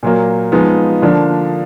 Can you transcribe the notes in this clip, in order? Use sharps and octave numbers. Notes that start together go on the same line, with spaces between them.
A#2 F#3 A#3
F3 G#3 B3 D#4
D3 F3 A#3 D4